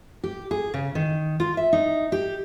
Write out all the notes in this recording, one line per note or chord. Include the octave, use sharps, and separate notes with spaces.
G4
G#4
C#3
D#3
F4
E5
D#4
G4